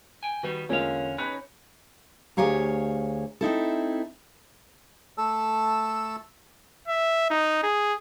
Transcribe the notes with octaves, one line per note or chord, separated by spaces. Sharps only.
G5 G#5
D#3 G3 B3 F#4 B4
E2 D3 G#3 A#3 C#4 F4 F5
D#4 B4 C#5 B5 F#6
D2 G4 G#4 C#5 F5 A#5
C4 D#4 E4 A4
A3 A4 A5 E6
E5
D#4
G#4